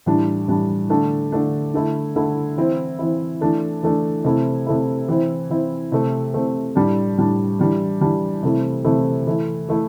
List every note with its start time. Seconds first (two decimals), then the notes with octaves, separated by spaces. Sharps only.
0.06 A2 E3 G3 D4
0.48 A2 E3 G3 D4
0.90 D3 A3 D4
1.32 D3 A3 D4
1.74 D3 A3 E4
2.16 D3 A3 E4
2.58 E3 C4 E4
2.99 E3 C4 E4
3.41 E3 A3 D4
3.83 E3 A3 D4
4.25 C3 A3 E4
4.67 C3 A3 E4
5.08 E3 C4 E4
5.50 E3 C4 E4
5.92 C3 A3 C4
6.34 C3 A3 C4
6.75 A2 G3 D4
7.18 A2 G3 D4
7.59 E3 G3 D4
8.01 E3 G3 D4
8.43 C3 E3 A3 E4
8.84 C3 E3 A3 E4
9.27 E3 A3 E4
9.69 E3 A3 E4